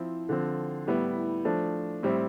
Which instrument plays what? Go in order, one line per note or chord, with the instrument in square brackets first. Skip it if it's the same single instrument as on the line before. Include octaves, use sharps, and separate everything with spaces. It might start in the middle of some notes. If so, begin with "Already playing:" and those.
Already playing: [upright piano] F3 C4 E4
D3 F3 C4
A2 G3 B3 E4
F3 A3 D4
A2 G3 C4 E4